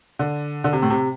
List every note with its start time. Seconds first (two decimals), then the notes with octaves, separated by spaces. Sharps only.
0.19 D3
0.64 D3
0.73 C3
0.82 A2
0.90 C3